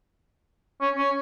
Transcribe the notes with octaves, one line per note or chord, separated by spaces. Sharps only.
C#4
C#4